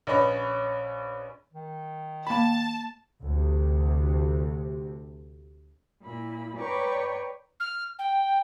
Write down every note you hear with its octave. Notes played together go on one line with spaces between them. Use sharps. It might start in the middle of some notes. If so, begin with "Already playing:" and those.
A#1 C#4 B4 C#5 D#5 B5
D#3
A#3 A5 B5
D2 C3
A#2 E4 B5
B4 C#5 D5 G5 A#5 C#6
F6
G5